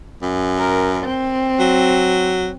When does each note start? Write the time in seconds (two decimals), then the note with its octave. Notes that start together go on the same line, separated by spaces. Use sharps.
0.22 F#2
0.59 A#4
1.03 C4
1.59 F#3